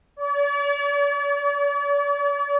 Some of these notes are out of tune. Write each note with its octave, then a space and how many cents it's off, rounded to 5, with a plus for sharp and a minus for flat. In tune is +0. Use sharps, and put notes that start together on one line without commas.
D5 -45